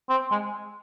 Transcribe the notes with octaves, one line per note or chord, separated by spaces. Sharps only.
C4
G#3